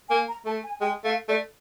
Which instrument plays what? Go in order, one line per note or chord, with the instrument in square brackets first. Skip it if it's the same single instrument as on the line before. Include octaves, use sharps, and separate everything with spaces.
[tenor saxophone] A#3 [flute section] G#5
[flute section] A#5
[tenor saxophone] A3 [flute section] A5
[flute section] G#5
[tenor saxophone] G#3 [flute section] G5
[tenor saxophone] A3 [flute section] F5
[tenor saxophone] A3 [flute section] D5